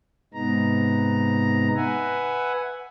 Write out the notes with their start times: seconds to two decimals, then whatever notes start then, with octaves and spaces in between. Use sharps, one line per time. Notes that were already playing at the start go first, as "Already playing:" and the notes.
0.34 G#2 C3 G#3 B3 D#4 A#5
1.76 B4 E5 F#5 G#5